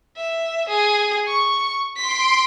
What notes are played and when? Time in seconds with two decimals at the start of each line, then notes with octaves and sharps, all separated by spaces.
0.16 E5
0.69 G#4
1.27 C#6
1.97 C6 B6 D7